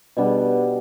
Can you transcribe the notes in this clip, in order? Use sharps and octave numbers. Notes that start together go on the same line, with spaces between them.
B2 G3 B3 D4